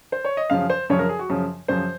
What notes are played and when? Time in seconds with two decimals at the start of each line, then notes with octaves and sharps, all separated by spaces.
0.12 C5
0.25 C#5
0.37 D#5
0.50 F#2 C#3 F3 F5
0.70 C5
0.90 F#2 C#3 F3 C#5
0.99 A#4
1.09 G#4
1.19 F#4
1.29 F#2 C#3 F3
1.68 F#2 C#3 F3 C5